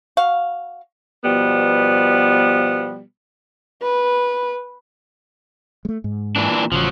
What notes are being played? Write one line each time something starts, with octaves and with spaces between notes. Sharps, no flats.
F#4 F5
B2 F3 G3 B3
B4
G#3 A3
G#2
A#2 E3 D4
A1 C#3 F3 F#3